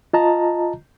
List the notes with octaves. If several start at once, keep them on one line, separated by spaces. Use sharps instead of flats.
F4 D#5 A5 A#5